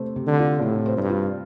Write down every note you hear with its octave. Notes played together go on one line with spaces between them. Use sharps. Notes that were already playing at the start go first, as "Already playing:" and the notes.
Already playing: C3 A3 C5
C3
D3
F4
A2 C3
C5
G2
F4